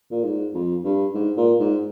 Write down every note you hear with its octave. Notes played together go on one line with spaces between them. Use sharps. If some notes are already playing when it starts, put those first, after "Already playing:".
A#2
G#2
F2
G2
G#2
A#2
G#2